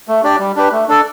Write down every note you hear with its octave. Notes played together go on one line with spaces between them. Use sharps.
A3
D4 G4 D5
G3
D4 G4 B4
A3
D4 A4 D5